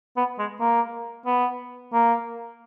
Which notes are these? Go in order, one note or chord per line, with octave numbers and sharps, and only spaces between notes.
B3
G#3
A#3
B3
A#3